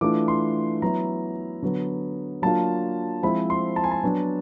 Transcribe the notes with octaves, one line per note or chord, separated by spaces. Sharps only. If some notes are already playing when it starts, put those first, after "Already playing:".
E3 A3 D4 F4 D6
C6
F#3 B3 E4 A#5
D3 F#3 B3
F#3 A#3 D4 F4 A5
F3 G#3 C4 E4 B5
C6
A5
G#5
A5
F#3 B3 D4